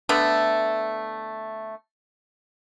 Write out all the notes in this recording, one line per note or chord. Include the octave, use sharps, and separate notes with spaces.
D3 A3 B3